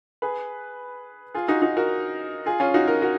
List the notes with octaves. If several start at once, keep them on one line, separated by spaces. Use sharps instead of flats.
G#4 B4
F4 G#4
D#4 F#4
D#4 F#4
F#4 A#4
F4 G#4
C#4 F4
D#4 F#4
F#4 A#4
F#4 A#4